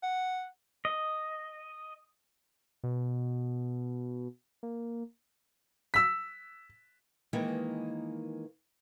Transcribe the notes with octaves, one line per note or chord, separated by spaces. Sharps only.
F#5
D#5
B2
A#3
E6 B6
D#3 E3 G#3 A#3